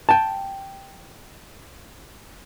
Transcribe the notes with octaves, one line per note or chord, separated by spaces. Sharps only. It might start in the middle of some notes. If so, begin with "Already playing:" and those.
G5 A5